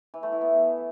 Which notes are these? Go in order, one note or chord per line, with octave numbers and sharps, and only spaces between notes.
E3
A3
E4
B3